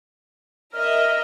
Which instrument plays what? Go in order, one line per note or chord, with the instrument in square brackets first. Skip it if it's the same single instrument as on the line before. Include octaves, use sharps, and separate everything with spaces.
[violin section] A#4 D#5 E5 [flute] F6